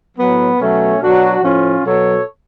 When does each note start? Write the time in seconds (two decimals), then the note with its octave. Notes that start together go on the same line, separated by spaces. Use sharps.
0.18 A2 F#3 B3
0.60 B2 F#3 A3 C#4
1.01 B2 F#3 D4 F#4
1.42 A2 F3 C#4 F4
1.85 B2 F#3 A4 C#5